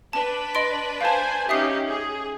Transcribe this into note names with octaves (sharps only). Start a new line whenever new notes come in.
D4 B4 A5
D#5 C6 D7
C5 F5 G#5 A5
C#4 D#4 G4 E5 D#6 C7
G#4